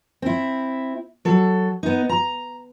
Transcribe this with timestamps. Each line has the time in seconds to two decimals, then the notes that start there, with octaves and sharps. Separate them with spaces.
0.22 C4 E4
1.25 F#3 A4
1.83 B3 D#4
2.09 A#5